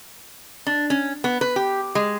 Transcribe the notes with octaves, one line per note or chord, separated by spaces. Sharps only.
D4
C#4
B3
B4
G4
G#3